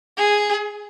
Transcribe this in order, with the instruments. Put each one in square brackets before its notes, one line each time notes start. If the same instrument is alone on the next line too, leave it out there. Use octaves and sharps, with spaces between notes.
[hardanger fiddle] G#4